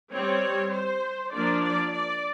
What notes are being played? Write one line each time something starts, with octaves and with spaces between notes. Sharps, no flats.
G3 C4 C#5
C5
F3 A#3 D4 D5
D5
D5